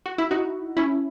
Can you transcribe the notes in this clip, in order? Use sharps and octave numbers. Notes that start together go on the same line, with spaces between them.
F#4
E4
D#4 F#4
C#4 E4